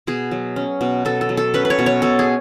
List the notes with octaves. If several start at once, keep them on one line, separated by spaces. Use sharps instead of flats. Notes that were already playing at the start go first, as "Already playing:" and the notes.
B2 G#4
F#3
C#4
B2
B2 A4
A4
F#3
A4
C#4 B4
B4
C#5
B2
C#5
B2 A4
G#4